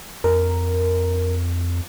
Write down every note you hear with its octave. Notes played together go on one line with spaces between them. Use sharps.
F2 A#4